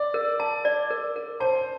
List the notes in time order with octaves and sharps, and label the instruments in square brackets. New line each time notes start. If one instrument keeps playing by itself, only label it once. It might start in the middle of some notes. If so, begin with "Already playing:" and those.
Already playing: [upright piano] D5
[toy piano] A#4
A5
D5
A#4
A#4
[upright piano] C5 [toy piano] A5